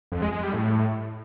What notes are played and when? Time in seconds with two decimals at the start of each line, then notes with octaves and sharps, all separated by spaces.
0.12 F2
0.22 G#3
0.32 G#3
0.43 G3
0.53 A2